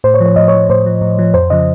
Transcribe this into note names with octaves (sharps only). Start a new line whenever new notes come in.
A2 C5
C#5
F3
C#5
A2 D#5
C#5
F3
A2 C5
F3
A2
F3
F2 C5
C#3 F3 D#5